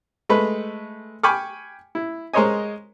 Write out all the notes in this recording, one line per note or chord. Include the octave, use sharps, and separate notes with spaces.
G#3 A3 B4
G5 G#5 B5 C#6 D6 F6
E4
G#3 A#4 C5 C#5 D#5 G#5